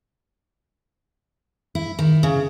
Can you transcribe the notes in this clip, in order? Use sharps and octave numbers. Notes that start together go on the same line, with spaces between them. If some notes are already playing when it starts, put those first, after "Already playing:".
E4
D#3
C#3